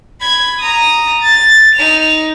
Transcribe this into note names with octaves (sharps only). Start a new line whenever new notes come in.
B5 G#6
A#5 D#6
A6
D#4 F7